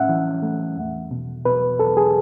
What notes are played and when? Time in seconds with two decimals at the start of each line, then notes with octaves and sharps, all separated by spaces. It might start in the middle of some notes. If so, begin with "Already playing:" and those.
Already playing: A2 C#4 E5 F#5
0.09 E3
0.42 A3
0.77 E2
1.11 B2
1.45 B2 B4
1.80 E2 A4
1.97 G#4